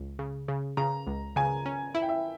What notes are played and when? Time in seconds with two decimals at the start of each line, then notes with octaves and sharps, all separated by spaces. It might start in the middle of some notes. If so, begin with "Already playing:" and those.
Already playing: C#2
0.19 C#3
0.48 C#3
0.77 C#3 A#5
1.07 C#2
1.36 C#3 G#5
1.66 C#4
1.94 E4 E5
2.02 G5
2.09 E5